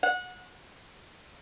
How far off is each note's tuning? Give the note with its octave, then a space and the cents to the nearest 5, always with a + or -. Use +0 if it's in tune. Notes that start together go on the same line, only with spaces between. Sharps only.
F#5 -30